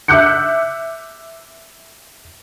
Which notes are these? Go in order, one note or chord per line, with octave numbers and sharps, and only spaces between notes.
E5 D6 E6 F#6 G6 C#7